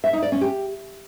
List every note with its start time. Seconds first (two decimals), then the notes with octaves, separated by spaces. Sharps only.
0.04 E5
0.13 D#4
0.23 D5
0.32 C#4
0.41 G4